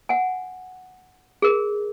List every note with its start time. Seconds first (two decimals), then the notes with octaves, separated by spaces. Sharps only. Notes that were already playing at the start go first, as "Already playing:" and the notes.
0.09 F#5 G#5
1.42 G#4 A#4